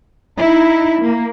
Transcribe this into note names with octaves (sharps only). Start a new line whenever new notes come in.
D#4 E4
A#3